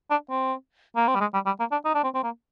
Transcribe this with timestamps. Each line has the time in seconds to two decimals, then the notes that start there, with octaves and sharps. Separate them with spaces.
0.10 D4
0.30 C4
0.96 A#3
1.08 C4
1.15 G3
1.20 G#3
1.34 G3
1.46 G3
1.60 A#3
1.72 D4
1.85 D#4
1.95 D4
2.03 C4
2.14 C4
2.23 A#3